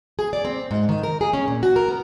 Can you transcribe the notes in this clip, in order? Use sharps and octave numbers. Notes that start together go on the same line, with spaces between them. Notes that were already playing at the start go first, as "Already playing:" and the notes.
G#4
D5
C4
G#2
D#3
A#4
G#4
C#4
A#2
F#4
A#4
B3